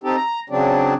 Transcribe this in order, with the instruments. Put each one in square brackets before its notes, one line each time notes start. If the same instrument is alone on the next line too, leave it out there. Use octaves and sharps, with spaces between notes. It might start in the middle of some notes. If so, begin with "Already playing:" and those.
[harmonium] C4 D#4 G4 A4
A#5
C#3 F#3 C4 D4